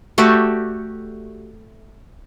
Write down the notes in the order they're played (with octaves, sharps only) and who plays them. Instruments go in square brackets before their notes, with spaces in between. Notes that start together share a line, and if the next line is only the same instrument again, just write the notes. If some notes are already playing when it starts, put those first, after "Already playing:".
[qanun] A3 F#4 G4 D5